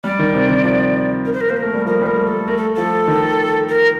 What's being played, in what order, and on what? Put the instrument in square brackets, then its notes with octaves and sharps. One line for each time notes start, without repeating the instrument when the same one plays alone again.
[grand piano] G3 [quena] D5
[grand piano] D#3
C3
D#3
F3
[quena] A#4
C5
A#4
[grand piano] A#3 [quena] C5
[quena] A#4
[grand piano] A3
G3
[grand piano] F3 [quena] A#4
[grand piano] G3 [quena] C5
[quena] A#4
[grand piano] A3
[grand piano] A3 [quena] A4
[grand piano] A3 [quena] A#4
[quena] A4
[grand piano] F3 [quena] A4
[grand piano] D#3
[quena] A#4